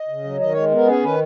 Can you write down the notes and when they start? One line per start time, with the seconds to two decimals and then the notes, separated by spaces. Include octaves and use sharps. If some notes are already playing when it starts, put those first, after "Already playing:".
Already playing: D#5
0.09 C#3
0.24 F#3
0.39 D#3 D#5
0.52 G#3 C#5
0.71 B3 A#4
0.87 C#4 G#4
1.03 D#3 B4